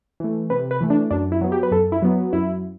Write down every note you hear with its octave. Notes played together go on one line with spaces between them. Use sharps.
E3 A3
C3 B4
B4
E3 A3
D4
F#2 D4
E4
F#3 B3
G4
B4
F#2 A4
E4
F#3 B3
F#2 E4